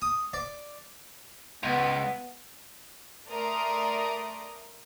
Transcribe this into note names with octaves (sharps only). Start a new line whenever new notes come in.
D#6
D5
C#2 B3
A3 A#4 D5 A#5 C6 D#6